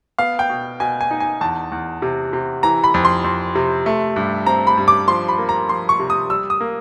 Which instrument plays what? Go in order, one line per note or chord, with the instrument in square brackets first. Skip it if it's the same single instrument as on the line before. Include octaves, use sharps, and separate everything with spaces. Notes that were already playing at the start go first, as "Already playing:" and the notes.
[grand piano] B3 F5
G5
B2
B2 G#5
G#5
D#4
G#5
E2 A5
E2
C3
C3
E3 A#5
B5
F2
C6
F2
C3
A3
G2
C4 A#5
B5
G2
D6
F3 C6
B5
A#3
A#5
F3 C6
C#6
C3
D#6
G3 E6
D#6
A#3